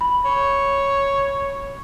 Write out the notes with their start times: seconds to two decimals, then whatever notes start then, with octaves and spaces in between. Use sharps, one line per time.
0.01 B5
0.25 C#5